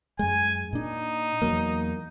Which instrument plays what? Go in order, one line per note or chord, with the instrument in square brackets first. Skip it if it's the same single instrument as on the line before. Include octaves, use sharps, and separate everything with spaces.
[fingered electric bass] F#2 G#3 [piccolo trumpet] G#5
[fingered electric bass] A#2 D4 [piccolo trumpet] D#4
[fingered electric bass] E2 F#3 A#3